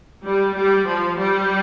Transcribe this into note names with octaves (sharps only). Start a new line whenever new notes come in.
G3
G3
F3
G3